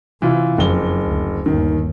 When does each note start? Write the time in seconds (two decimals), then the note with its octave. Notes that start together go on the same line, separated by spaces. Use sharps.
0.22 C3 E3 F4
0.58 F#1 F2 G7
1.06 D2
1.46 G1 D#2 D#3